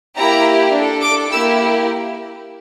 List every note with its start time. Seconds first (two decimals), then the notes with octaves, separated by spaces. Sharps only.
0.17 A#3 E4 G4 A#5
0.74 D4
0.79 A4
1.02 D6
1.30 A#3 E4 G4 E6